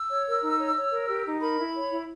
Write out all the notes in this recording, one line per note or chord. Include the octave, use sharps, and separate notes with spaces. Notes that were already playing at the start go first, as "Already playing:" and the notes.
Already playing: E6
C#5
A#4
D#4
C#5
C#5
A#4
G4
D#4
A#4 B5
E4
C#5
E4